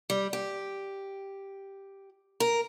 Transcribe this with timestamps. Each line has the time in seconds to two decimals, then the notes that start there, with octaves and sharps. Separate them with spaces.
0.10 G3
0.33 G4
2.40 A#4